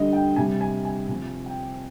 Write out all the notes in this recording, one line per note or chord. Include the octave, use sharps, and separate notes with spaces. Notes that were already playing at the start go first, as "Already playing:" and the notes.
Already playing: D3 G3 D#5
G5
C3 G3 G#5
G#5
G#5
C3 F3 G#5
G5